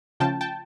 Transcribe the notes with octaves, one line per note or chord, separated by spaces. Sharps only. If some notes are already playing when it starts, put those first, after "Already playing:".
C#3 F3 A3 C#4 F4 G5 A5
G5 A5